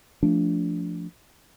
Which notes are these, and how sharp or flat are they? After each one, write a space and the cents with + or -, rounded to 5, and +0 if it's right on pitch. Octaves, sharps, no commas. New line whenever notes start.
F3 -15 A3 +0 D4 -20